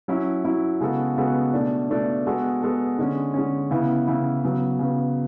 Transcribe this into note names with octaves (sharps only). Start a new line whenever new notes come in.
F#3 C#4 E4
F#3 C#4 E4
C#3 G#3 B3 F#4 A4
C#3 G#3 B3 F#4 A4
B2 A3 D4
B2 A3 D4
G#3 B3 F#4 A4
G#3 B3 F#4 A4
D3 G#3 C#4
D3 G#3 C#4
C#3 E3 B3 E4
C#3 E3 B3 E4
C#3 F#3 B3
C#3 F#3 B3